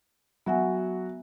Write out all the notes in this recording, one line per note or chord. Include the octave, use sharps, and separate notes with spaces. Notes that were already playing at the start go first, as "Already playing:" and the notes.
F#3 B3 F#4 E5 G#5